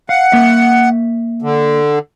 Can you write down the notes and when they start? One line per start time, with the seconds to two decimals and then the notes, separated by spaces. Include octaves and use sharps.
0.09 F5 F#5
0.32 A#3 E5
1.42 D3